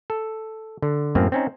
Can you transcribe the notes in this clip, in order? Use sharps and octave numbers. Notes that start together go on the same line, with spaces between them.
A4
D3
F#2 A2 A#3 C4
C4 C#4 D#4